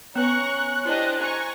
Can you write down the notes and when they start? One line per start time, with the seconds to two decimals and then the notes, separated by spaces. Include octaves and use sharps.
0.16 B3 C#4 B4 A#5 C#6 F#6
0.86 D4 E4 G4 C5 D#5
1.19 G#5 A#5 C#6